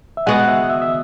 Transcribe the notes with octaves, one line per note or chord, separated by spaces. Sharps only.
E5
G#3 B3 F#4 F#5
E5
E5
E5